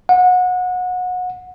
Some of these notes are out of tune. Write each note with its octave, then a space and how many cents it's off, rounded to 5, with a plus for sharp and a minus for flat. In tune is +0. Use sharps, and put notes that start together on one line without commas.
F#5 -25